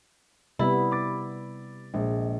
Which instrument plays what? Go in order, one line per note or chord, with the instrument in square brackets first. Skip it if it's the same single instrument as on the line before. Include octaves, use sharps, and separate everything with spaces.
[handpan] C3 G3 B3 [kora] E4 [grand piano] B5
[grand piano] B5 D6 A6
[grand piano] A#1 [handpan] G#3